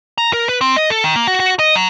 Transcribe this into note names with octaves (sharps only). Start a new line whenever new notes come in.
A#5
A#4
B4
C4
D#5
A4
D#3
A#3
F#4
F#4
D#5
F#3